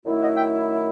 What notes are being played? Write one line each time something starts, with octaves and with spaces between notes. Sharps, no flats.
F#2 D#3 A3 E4
D#5 F#5
E5 G5